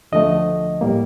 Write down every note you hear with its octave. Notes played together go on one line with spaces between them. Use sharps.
D2 D3 F3 A3 D#5
A2 G3 A#3